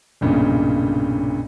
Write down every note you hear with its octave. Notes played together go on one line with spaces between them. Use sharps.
B1 G2 A#2 C#3